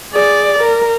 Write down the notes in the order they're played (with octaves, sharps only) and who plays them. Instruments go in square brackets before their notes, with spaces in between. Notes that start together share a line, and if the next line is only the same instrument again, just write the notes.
[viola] G#4 D5
A#4